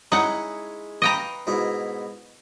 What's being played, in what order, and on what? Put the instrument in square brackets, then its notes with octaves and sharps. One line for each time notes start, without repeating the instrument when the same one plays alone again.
[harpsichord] G#3 C#4 E4 [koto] D#4 F#5
[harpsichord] B4 F5 C#6 [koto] D#5 G5 A#5
[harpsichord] G#2 B2 E4